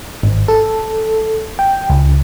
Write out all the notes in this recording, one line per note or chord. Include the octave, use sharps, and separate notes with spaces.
G#1
A4
G5
C#2